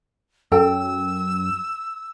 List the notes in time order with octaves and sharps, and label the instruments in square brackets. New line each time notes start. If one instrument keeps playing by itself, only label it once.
[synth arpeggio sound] F#2 [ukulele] A4 G5 [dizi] E6